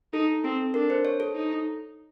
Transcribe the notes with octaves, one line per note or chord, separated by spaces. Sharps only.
D#4 A4
C4 A4
D4 A#4
C5
C#5
A4
D#4